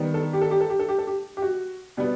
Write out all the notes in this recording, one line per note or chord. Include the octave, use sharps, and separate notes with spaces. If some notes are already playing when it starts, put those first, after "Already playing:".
Already playing: D#3 G3 B3
A4
G4
A4
G4
A4
G4
A4
G4
A4
G4
G4
F#4
B2 G3 B3